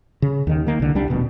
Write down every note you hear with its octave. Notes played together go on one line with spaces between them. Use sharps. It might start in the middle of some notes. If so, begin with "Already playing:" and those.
C#3
D#2 D#3
D#3 A#3
C2 D3
C2 G3 D4
D#1 B2